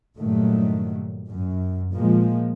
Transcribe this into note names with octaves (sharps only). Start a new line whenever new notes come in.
G2 A#2 D#3 F#3 A3
F#2
A#2 F3 G#3 A#3